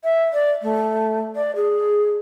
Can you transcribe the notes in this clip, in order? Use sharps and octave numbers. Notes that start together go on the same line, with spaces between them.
E5
D5
A3
D5
G#4